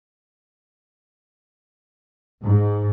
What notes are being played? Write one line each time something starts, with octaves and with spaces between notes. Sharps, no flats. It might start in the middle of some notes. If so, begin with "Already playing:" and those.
G#2